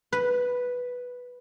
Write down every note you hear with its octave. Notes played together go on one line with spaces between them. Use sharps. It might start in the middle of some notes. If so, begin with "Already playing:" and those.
B4